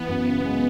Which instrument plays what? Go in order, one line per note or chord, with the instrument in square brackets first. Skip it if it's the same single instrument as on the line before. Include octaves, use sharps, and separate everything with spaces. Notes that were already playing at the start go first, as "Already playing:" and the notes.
Already playing: [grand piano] E3 [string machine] B3
[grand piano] F#2
C#3
G#3